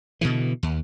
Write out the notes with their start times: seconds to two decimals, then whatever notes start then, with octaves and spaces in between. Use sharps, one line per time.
0.21 B2 D3 E3
0.63 D#2